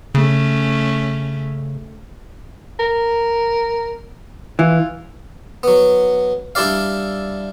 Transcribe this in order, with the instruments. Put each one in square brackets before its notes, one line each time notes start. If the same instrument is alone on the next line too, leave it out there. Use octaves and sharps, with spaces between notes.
[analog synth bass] C#3 [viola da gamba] A3 C#4
[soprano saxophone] A#4
[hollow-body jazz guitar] E3 [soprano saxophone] F4
[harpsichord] F#3 B3
G3 D4 E4 G4 D5 F5